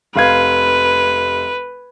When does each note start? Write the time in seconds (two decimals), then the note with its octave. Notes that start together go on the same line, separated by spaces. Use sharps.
0.16 F1 B4 F5 G#6